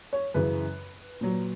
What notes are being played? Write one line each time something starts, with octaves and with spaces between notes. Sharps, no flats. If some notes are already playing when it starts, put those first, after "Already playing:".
C#5
F#2 C#3 E3 B4
A#2 F#3